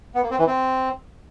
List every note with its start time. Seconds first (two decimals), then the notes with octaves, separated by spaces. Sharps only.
0.15 B3
0.23 A#3
0.31 C4
0.39 E3
0.47 C4